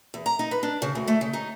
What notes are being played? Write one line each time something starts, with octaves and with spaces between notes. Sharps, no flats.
E2
A#5
D#4
B4
D4
C#3
D2
A3
C#3
D#4